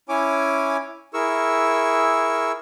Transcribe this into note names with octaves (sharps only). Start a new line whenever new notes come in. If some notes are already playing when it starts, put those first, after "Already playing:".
C#4 E4 C#5 G#5 D6
E4 G#4 A#4 C#6 E6